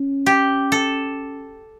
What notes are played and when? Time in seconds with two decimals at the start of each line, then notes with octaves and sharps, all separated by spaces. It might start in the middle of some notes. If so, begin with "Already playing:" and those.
Already playing: C#4
0.26 G4
0.72 A4